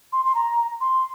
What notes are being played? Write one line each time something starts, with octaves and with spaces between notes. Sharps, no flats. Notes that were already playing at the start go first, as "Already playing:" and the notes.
C6
C6
A#5
C6